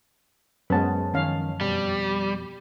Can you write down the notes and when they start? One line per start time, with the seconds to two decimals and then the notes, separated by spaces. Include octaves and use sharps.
0.70 F#2 G#3 B3 C#4 B4 C5 F#5 A5
1.14 D#3 F3 C#4 D#4 F5
1.61 F2 G#2 B2 G3